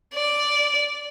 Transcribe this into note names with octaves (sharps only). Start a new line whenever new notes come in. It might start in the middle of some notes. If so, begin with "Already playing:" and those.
D5